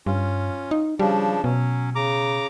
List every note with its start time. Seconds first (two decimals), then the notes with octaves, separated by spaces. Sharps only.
0.06 G2 C#4 F4
0.71 D#4
0.99 C#3 F3 G3 D4
1.44 B2 F#3 C#4
1.95 C#3 A#5 D6